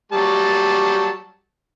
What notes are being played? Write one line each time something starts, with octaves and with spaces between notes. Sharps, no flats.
F#3 G3 A5